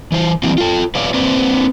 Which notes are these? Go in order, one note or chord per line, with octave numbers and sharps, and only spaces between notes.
E3 C5
E3 F#3 G3 A#3 C4
F4 A4
B4 C#5 D5 F5
A#3 C4 B4 C5 D5